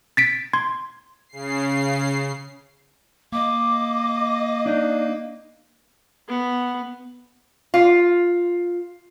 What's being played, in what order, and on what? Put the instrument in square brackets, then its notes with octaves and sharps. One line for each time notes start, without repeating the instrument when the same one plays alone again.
[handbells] A6 B6 D7
C6 G#6
[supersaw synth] C#3 C7
[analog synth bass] A#3 [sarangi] D#5 [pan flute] D6
[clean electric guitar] D4 D#4
[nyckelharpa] B3
[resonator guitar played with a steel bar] F4